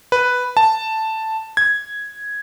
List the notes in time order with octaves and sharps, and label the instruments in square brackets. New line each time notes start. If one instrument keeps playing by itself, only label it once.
[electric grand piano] B4
A5
G#6